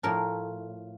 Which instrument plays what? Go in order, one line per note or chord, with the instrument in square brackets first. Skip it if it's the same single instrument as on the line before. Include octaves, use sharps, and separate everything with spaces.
[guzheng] A2 F3 A#4